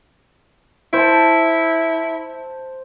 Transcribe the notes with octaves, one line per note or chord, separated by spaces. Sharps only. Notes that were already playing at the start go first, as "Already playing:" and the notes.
E4 C5 A5